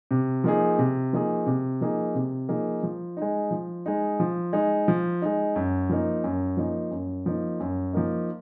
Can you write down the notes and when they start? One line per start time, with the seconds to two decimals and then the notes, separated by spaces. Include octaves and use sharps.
0.11 C3
0.44 F3 A#3 D#4 G#4
0.79 C3
1.13 F3 A#3 D#4 G#4
1.46 C3
1.81 F3 A#3 D#4 G#4
2.15 C3
2.48 F3 A#3 D#4 G#4
2.83 F3
3.17 G#3 D#4
3.51 F3
3.86 G#3 D#4
4.20 F3
4.53 G#3 D#4
4.88 F3
5.22 G#3 D#4
5.56 F#2
5.89 F3 A#3 D#4
6.24 F#2
6.57 F3 A#3 D#4
6.91 F#2
7.26 F3 A#3 D#4
7.60 F#2
7.93 F3 A#3 D#4